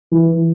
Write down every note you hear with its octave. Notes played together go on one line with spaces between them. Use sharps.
E3